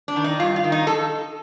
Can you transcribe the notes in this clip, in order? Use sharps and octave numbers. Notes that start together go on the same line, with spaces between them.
D4
D#3
D#4
G2 F4
F4
D#3
D#4
A4